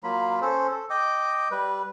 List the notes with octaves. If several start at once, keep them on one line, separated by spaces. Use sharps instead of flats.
F#3 A#3 F4 B5
C#4 A4 C5
A4
D#5 G5 D6
G3 B4